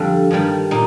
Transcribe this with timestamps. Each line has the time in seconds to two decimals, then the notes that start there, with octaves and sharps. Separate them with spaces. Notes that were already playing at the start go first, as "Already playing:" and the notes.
Already playing: F2 D3 G3 D4
0.31 G2 D#3 G3
0.71 A#2 D#4